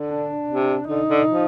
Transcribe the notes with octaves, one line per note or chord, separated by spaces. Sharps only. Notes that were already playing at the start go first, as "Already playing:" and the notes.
Already playing: D3
D4
C3
D3 D#4
D3
F3